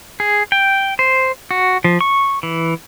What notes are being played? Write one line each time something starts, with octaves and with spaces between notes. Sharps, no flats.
G#4
G5
C5
F#4
F3
C#6
E3